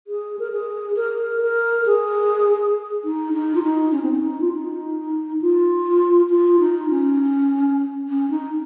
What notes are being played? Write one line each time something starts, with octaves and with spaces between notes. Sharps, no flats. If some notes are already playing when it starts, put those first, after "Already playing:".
G#4
A#4
G#4
A#4
A#4
A#4
G#4
D#4
D#4
F4
D#4
C#4
C4
C#4
D#4
F4
D#4
F4
F4
D#4
C#4
C#4
D#4